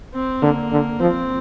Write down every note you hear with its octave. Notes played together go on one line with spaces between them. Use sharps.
C4
D3 A#3
D3
F3 C4